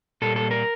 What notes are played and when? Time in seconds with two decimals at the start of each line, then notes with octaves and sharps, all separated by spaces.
0.22 A#2 G3 A#3 A4
0.36 A4
0.51 A#4